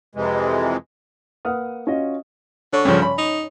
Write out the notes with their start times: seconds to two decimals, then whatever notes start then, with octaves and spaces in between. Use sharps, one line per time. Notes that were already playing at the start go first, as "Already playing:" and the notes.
0.15 F2 C3 E3 G#3
1.45 A#3 B4 F#5 D#6 F6
1.87 C#4 F4 F#4 D#5
2.73 D3 C#5
2.85 G2 C#3 F3 C#4
3.02 B5
3.18 D#4